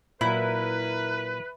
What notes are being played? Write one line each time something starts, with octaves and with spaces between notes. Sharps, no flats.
A#2 F#3 E4 A#4 B4